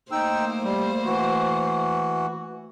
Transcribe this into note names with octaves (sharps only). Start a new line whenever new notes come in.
A3 A#3 D#4 C5 G5 E6
G3
E3 F#4